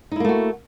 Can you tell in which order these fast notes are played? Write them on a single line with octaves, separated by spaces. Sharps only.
D#4 E4 A#3 A3 F#4